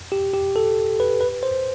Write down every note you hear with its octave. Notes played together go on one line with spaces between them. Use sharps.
G4
G4
A4
B4
B4
C5